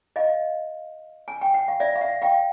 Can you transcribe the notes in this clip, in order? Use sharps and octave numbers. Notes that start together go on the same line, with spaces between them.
D#5 F5
G#5
G5
F#5
F5
D5 E5
F5
E5 F#5
F5 G5